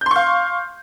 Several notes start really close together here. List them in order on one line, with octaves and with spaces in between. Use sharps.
G6 C6 C#6 F5